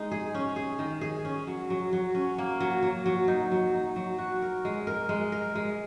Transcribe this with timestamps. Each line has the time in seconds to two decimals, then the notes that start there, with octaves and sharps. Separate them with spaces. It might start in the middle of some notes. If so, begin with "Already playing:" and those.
Already playing: G#3 D#4
0.11 G#4
0.34 C#4
0.56 G#4
0.79 D#3
1.01 G#4
1.25 C#4
1.47 F#3
1.70 F#3
1.93 F#3
2.15 C#4
2.38 A#3
2.60 F#3
2.83 F#3
3.06 F#3
3.28 D#4
3.52 F#3
3.74 D#4
3.96 F#3
4.18 F#4
4.42 A#4
4.65 G#3
4.87 A#4
5.09 G#3
5.32 A#4
5.55 G#3